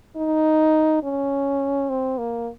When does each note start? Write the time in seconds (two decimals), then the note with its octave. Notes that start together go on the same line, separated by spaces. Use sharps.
0.16 D#4
1.03 C#4
1.90 C4
2.18 A#3